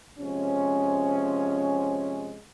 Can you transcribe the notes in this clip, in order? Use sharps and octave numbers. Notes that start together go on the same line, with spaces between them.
C3 F3 G#3 C#4